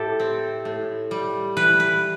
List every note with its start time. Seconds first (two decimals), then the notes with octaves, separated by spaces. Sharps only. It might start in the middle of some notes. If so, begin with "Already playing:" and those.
Already playing: A2 E4 G4 A4
0.20 C4
0.65 A2
1.11 G3
1.57 E3 B4
1.80 B4